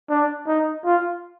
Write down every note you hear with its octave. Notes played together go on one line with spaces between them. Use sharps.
D4
D#4
F4